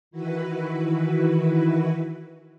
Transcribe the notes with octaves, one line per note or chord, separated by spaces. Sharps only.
D#3 E3 E4 F#4 B4